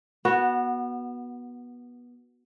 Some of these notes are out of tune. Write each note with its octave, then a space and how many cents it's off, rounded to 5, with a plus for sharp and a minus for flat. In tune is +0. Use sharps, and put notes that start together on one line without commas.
B3 -20 F#4 +0